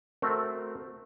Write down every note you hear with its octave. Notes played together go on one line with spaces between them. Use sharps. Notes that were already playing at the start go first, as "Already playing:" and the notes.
A3 C4 F#4 A#4